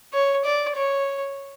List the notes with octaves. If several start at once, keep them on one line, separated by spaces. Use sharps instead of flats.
C#5
D5
C#5